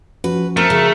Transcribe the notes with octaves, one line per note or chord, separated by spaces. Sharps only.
F3 C#4 F#4 B4
A3 C4 A#4
C#3